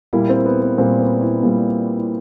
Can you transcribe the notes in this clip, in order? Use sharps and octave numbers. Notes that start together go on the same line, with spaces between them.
A#2 G3 A#3 E4
C4
B3
B3
A#2 G3 A#3 C4
B3
E4
A#2 G3 A#3
E4